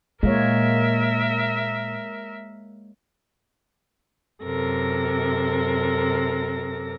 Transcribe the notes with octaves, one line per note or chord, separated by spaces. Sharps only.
A#2 G#3 A#3 A#4 C#5 E5
F#2 C3 A4 A#4 A#6